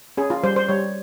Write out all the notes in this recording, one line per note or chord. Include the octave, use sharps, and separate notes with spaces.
C#4 G#4
F4
G3 C5
C5
G3 C#5